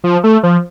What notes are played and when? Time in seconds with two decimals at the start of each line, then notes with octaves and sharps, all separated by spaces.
0.04 F3
0.24 A3
0.43 F3